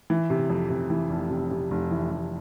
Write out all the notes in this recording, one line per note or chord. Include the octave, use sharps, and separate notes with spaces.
E3
C3
F2
C3
E3
F1
C3
C3
F1
E3
F1